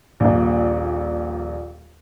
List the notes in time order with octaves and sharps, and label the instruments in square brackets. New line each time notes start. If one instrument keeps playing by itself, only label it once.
[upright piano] D#1 A#1